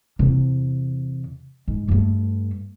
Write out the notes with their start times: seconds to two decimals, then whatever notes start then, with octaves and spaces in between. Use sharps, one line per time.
0.19 E2 C3
1.68 G#2
1.88 G2 A3